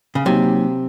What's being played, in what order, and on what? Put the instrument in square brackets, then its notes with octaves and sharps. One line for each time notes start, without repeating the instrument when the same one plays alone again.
[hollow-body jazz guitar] C#3
[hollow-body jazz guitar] C3 [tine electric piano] F#3 A#3 D#4